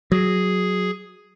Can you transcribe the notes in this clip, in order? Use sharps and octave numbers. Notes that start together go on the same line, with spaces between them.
F#3 G#4